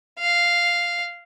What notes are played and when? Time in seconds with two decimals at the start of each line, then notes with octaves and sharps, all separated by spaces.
0.19 F5